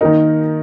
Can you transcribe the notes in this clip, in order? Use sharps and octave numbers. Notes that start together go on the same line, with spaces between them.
D#3 A#3 D#4 A#4